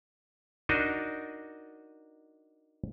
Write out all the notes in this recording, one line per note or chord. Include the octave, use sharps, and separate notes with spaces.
D4 D#4 F#4 A#4 D#5